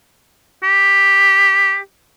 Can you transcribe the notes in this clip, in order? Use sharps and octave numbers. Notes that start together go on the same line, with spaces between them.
G4